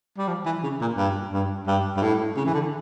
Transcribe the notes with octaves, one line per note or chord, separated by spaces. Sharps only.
G3
F3
E3
C#3
A#2
G2
G2
G2
G2
A2
C#3
E3
D3